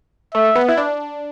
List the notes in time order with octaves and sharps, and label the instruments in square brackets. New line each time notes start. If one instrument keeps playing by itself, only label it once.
[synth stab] A3 [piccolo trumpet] E5
[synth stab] B3
E4
D4